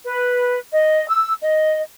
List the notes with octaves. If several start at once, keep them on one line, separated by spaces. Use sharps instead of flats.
B4
D#5
E6
D#5